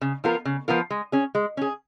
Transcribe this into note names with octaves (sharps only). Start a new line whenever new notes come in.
C#3
F3 B3 F4 A#4
C#3
F3 B3 F4 A#4
G#3
C#4 G#4
G#3
C#4 G#4